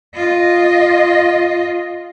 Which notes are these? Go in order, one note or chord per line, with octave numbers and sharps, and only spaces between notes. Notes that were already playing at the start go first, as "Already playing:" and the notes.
F4 D#5